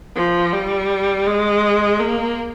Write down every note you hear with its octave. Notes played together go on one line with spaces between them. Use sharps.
F3
G3
G#3
A#3